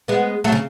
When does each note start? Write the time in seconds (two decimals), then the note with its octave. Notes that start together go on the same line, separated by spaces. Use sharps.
0.08 G#3 B3
0.44 F#3 A3
0.52 C#3